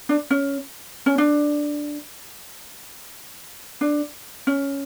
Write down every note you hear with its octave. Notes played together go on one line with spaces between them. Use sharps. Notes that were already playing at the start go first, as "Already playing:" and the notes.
D4
C#4
C#4
D4
D4
C#4